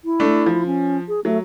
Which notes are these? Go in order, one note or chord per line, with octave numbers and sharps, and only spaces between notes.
E4
A3 D4
F3
C#4
G#4
F#3 A3